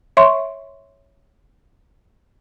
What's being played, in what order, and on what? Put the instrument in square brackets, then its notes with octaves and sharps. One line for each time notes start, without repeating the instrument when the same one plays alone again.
[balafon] C#5 E5 C6 C#6